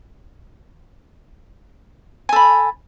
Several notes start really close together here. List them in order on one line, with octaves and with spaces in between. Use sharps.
G#5 A4 B5